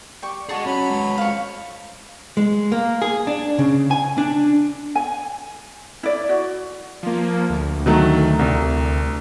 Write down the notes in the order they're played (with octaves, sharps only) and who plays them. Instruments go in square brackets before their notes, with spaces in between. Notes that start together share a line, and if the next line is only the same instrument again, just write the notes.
[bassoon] G3 [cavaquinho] G5 C#6 D6
[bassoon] D3 [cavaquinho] F#4 A5 C#6 [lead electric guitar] G#4 D#5
[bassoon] F#3 [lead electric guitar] C#4 [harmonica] B5
[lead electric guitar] G#3 B4
[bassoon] F2 [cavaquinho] F5 C#6
[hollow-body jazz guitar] G#3
A#3
G#4
D4
C#3
G#5
D4
[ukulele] G#5
E4 D5
F#4
[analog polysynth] F3 A#3
D2
[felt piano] D#3 F#3 A3
C2